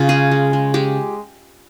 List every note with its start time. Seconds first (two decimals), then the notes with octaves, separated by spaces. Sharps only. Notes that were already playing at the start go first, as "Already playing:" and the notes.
Already playing: C#3 F4
0.08 G#3 G#4
0.31 G#3
0.53 G#3
0.74 G#3 G4